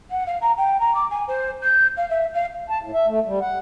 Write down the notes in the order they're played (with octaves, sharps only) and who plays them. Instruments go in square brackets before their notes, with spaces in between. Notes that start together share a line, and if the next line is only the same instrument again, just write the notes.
[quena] F#5
F5
A#5
G5
A#5
D6
G#5
C5
G6
F5
E5
F5
[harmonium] A5
A2
E5
A3
G3
F#5